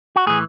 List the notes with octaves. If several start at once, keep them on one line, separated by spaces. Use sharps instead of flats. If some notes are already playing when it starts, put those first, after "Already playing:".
F#4
A2 E3 G#4